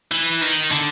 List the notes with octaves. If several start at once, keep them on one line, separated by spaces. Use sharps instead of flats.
E3
D#3
D3